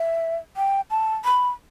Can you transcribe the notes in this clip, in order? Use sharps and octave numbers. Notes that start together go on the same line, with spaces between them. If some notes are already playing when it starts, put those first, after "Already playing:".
Already playing: E5
G5
A5
B5